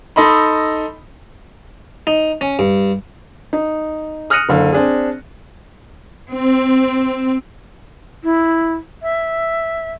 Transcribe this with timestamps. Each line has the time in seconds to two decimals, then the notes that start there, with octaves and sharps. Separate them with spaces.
0.16 D#4 A4 D#5 B5 C6
2.07 D#4
2.41 C#4
2.59 G2
3.53 D#4
4.30 D#6 F6 F#6 A#6 C#7 D#7
4.49 F#1 D3 F5
4.73 C4 D4 G#4
6.31 C4
8.24 E4
9.02 E5